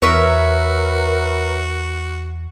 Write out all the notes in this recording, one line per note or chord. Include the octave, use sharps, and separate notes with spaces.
E2 F#4 A#4 B4 C#5 E5